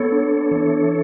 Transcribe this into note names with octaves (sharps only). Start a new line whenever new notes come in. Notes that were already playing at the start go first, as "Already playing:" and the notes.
Already playing: B3 A4 C#5
D4
E3